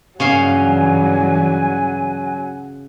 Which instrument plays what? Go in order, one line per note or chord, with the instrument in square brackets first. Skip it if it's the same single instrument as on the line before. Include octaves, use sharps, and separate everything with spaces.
[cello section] G2 E3 [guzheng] C#3 C#4 F5 [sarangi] F#3 [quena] G#5